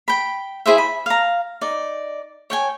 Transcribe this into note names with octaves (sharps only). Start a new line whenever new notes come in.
G5 B5
E4 G#4 C5 E5
B5
F5 A#5
D#4 D5
C#5 G5 G#5